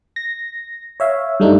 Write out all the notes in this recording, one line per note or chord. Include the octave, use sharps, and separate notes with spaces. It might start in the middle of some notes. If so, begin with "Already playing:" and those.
A#6
C#5 E5 F5
G2 G3 A3 D4 D#4